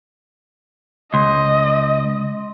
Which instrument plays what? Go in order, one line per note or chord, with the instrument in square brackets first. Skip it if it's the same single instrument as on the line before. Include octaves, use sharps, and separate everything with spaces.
[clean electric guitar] C#2 [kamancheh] D#5 [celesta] C6